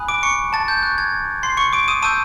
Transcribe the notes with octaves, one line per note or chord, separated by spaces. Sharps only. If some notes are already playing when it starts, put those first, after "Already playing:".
Already playing: G#5 B5 D#6 F#6
D6 D7
C#6 C#7
A5 A6
G6
C#6 F#6
G#6
C6 C7
C#6 C#7
D6 D7
D#6 D#7
A5 C#6 D#6 E6 G6 D#7